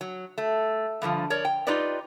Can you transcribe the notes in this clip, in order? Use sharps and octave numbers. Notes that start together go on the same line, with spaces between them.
F#3
A3
G2 D3 D#3 F3
A#4 C#5 D5
G5
D#4 F4 G4 B4 D5 D#5